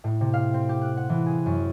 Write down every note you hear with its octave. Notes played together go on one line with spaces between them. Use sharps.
A2
C3
F5
C4
G4
F#6
F#5
E3
G#4
F#2